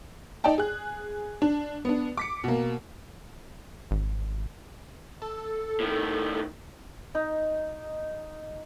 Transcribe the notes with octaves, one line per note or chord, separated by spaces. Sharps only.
D#4 D5 D#5 G5 A5
G#4 F#6
D4
B3 D4
D6 B6 C#7
B2 A#3
G#1
A4
A2 D#3
D#4